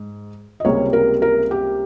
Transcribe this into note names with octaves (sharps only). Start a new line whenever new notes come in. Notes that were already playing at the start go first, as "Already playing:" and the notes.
Already playing: G#2
D#5
C#2 C3 G3 A#3 C#5
A#4
A#4
G4